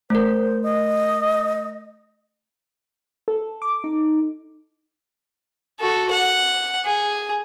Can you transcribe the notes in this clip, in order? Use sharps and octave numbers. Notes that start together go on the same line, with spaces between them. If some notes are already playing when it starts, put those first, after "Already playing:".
A3 A#4 C5
D#5
A4
D6
D#4
F#4 A4
F#5
G#4